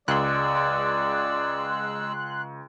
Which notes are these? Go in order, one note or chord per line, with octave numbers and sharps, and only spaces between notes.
C#2 G#3 D5 C6 E6 F#6